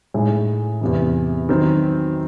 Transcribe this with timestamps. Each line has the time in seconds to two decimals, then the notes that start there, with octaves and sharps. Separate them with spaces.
0.14 A2 G#3 D#4 G#4
0.81 E2 C3 E3
1.49 D#3 F#3 C4